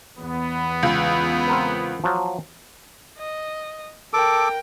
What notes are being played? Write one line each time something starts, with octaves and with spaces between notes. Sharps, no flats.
E2 B3
C#2
C4 A#4 B4
F3 F#3 A5
D#5
A4 A#4 G5 D6